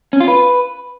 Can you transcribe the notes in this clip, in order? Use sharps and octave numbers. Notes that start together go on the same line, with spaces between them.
C#4
F4
B4